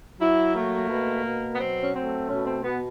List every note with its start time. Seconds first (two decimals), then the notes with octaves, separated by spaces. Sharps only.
0.20 F#3 E4
0.55 A3 A#3
0.89 B2
1.25 B2
1.54 B3
1.59 F#3 C4
1.82 C#4
1.95 A3 C4
2.29 B2 C#4
2.46 C4
2.63 B2 B3